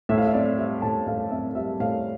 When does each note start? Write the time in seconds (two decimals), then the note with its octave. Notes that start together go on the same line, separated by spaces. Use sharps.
0.09 A2 E5
0.18 F5
0.26 E5
0.33 C4 D5
0.58 G3 E5
0.82 A2 A5
1.07 A2 F5
1.31 C4 E5
1.55 G3 E5
1.80 A2 F5